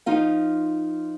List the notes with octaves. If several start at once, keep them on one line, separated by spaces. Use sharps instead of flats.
F3 D#4 F4 F5